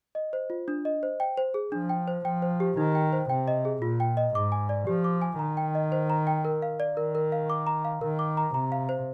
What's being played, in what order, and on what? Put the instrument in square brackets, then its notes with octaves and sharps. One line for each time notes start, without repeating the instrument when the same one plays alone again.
[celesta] D#5
C5
F4
D4
D#5
C5
G5
C5
G#4
[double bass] F3 [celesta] D4
[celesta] G5
C5
[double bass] F3 [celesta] G5
[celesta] C5
G4
[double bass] D#3 [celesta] D#4
[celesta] G5
C5
[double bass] C3 [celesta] G5
[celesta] D#5
G#4
[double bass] A#2 [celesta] F4
[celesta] G5
D#5
[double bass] G#2 [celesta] D6
[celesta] G#5
D5
[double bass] F3 [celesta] G4
[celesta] D6
G#5
[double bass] D#3 [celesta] A#5
[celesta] G5
D#5
C5
A#5
G5
A#4
F5
D5
[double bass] D#3 [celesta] A#4
[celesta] A#4
F5
D6
A#5
F5
[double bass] D#3 [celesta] A#4
[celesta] D6
A#5
[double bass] C3 [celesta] A#5
[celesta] F5
C5